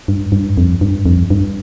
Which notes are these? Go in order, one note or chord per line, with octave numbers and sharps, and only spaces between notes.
G2
G2
F2
G2
F2
G2